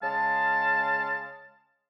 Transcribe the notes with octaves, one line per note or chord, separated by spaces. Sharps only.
C#3 G#3 F5 A5